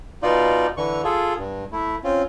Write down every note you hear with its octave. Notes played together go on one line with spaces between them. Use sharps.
B2 D#4 F4 D5
D3 E3 C#6
F4 G#4 A4
G2
A3 E4
C4 C#4 F4